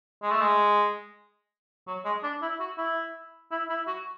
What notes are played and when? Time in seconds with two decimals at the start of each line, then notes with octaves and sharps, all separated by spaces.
0.23 G#3
0.31 A3
0.41 G#3
1.87 F#3
2.05 G#3
2.23 D4
2.42 E4
2.60 F#4
2.78 E4
3.51 E4
3.70 E4
3.87 F#4